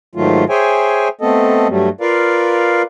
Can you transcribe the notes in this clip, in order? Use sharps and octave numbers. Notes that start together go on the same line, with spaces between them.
G#2 D#3 F#3 A3 F4
G#4 C5 C#5 E5 G5 G#5
A3 B3 C4 A4 D#5
G2 F#3 G3 A3
F4 A#4 B4 D5 F5